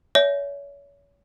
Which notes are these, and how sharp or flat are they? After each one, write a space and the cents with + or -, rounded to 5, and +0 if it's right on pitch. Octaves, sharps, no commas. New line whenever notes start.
C#5 +35 E5 +0 G#5 +25